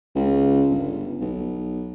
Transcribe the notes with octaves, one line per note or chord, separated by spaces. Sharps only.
C#2
G1
B1